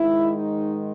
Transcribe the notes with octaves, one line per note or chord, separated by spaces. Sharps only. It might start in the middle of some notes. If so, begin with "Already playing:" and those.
Already playing: G#2 D#3 G#3 E4
D#4